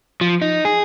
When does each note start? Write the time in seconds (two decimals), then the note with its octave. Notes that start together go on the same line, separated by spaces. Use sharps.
0.21 F3
0.42 D#4
0.65 G#4